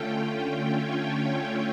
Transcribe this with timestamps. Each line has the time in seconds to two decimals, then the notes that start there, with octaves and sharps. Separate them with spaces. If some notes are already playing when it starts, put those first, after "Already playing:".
Already playing: D3 A3 C#4 F4 G5
0.70 C#5